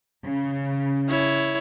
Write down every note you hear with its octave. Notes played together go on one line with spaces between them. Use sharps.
C#3
E4 C#5